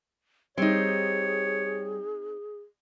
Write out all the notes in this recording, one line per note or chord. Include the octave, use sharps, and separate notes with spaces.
G3 C4 D#4 G#4 C#5